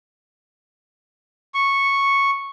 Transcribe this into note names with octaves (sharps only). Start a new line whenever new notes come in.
C#6